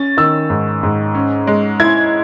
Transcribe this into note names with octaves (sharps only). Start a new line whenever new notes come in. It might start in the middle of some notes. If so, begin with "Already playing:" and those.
Already playing: C#4 A6
D#3 E6
G#2
G#2
C#4
G#3
E4 G#6